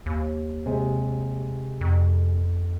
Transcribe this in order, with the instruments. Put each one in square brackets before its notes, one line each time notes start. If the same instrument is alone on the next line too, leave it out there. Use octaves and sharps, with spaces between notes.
[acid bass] D#2
[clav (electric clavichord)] C3 G#3
[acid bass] F2